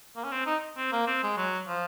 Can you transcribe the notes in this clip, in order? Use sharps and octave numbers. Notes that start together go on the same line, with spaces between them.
A#3
C#4
C4
D#4
C4
A#3
C4
G#3
F#3
F3